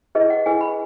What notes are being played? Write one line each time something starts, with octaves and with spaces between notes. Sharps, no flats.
E4 G#4 B4 D#5
F#5
E4 G#4 B4 G#5
B5